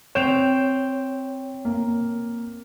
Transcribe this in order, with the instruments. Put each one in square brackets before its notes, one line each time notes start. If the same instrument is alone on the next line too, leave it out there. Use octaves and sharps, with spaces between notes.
[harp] C4 G6 D7 [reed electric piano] C#5 [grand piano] E7 F7
[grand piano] A#3